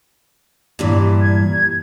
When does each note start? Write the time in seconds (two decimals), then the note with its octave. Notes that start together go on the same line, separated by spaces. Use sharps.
0.79 G2 A#2 E3
1.21 G#6